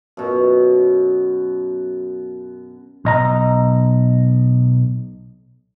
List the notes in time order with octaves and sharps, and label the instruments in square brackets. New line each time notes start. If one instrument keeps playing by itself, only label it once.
[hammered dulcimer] F#2 B2
[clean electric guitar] B1 D#5 A#5